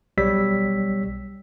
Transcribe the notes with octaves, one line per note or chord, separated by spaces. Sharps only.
B1 G3 C#5 E6 B6